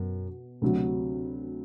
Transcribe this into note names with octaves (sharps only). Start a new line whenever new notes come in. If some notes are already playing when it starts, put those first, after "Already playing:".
Already playing: F#2 B2
D2 C3 F#3